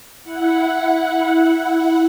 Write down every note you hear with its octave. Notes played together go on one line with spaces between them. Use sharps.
E4 F#5